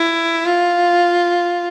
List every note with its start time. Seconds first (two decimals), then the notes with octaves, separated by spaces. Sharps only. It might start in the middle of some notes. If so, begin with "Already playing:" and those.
Already playing: E4
0.46 F4